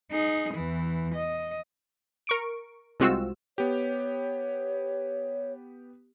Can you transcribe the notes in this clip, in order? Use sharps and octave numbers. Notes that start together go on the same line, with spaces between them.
D#4 G#4
E2 E3
D#5
A#4 C#6 D7
C2 G#3 C4 F4 F#4 E6
B3 G4 C#5